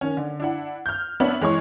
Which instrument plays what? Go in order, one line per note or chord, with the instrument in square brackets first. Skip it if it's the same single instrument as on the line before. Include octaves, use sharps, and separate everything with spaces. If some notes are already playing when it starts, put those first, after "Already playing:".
[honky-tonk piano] D#3 C#4
D3
D4 E4 F#5
F6 G6
B3 D4 C#5 E5 B5 F#7
E3 G#3 C#5 C#6